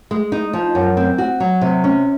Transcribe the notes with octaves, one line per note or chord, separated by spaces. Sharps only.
G#3
D#4
F3
F#2
C4
F#4
F#3
C3
C#4